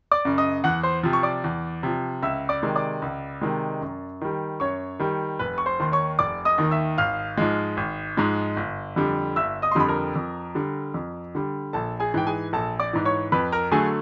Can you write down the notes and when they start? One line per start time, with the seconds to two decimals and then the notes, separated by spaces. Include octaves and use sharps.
0.12 D5 D6
0.25 F#2 C#3
0.38 D#5 D#6
0.64 E2 F#5 F#6
0.83 C5 C6
1.03 C3 F3
1.13 C#6
1.23 D5 D6
1.44 E2
1.83 C3 F3
2.22 C#2 E5 E6
2.49 D5 D6
2.63 C3 D#3 G#3
2.76 D5 D6
3.02 C#2
3.42 C3 D#3 G#3
3.81 F#2
4.21 D#3 G3
4.60 F#2 C#5 C#6
5.00 D#3 G3
5.39 F1 B4 B5
5.58 C#6
5.66 C5 C6
5.80 D#2 D#3 C6
5.92 C#5 C#6
6.19 F1 D5 D6
6.45 D#5 D#6
6.58 D#2 D#3
6.71 E5 E6
6.98 G#1 F5 F6
7.38 G#2 F3 G#3
7.77 G#1
8.17 G#2 F3 G#3
8.56 G1
8.96 F2 D3 G3
9.36 G1 E5 E6
9.62 D#5 D#6
9.71 C6
9.75 F2 D3 G3 B5
9.88 A#4 A#5
10.16 F2
10.55 D3 G3
10.94 F2
11.35 D3 G3
11.73 A#1 A4 A5
12.00 G#4 G#5
12.14 G#2 E3 G5
12.27 G#4 G#5
12.53 A#1 A4 A5
12.80 D5 D6
12.93 G#2 E3
13.05 C#5 C#6
13.32 F2 B4 B5
13.52 A#4 A#5
13.71 D3 F#3 A3 G#4 G#5